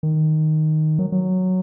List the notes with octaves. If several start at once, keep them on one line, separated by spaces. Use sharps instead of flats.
D#3
F#3
F#3